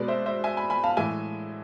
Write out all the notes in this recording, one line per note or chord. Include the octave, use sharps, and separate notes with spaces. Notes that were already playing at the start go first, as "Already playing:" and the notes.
Already playing: B2 G#3 B4 D5
C5 E5
C5 E5
E5 G#5
G#5 B5
G#5 B5
F5 A5
A2 E3 G#3 E5 G#5